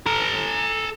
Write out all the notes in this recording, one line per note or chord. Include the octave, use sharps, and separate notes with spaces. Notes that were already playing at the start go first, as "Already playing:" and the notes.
A4 A#5